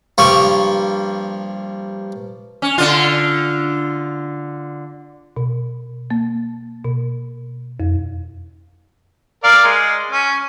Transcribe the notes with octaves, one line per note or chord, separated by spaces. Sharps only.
G2 F3 A#3 C#6
C#4
D3 F4
B2
A#3
B2
F2
A#4 D5 F5
G#3
C#4